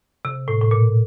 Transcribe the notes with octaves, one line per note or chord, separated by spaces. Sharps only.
C3
A2
A2
A#2